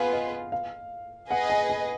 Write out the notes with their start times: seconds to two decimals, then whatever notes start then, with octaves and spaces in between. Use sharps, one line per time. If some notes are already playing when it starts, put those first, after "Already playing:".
Already playing: B3 F4 G#4 B4 F5
0.13 D#5
0.52 F5
1.30 G#4 B4 D#5 F#5
1.50 G#5
1.70 G#5